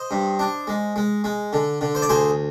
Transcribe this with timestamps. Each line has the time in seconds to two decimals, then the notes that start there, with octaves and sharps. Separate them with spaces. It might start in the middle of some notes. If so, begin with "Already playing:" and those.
Already playing: C5 D#5
0.11 G2
0.39 D4
0.67 G#3
0.96 G#3
1.24 G#3
1.53 D3
1.81 D3
1.95 C5
2.02 D5
2.09 D2 G#4 C5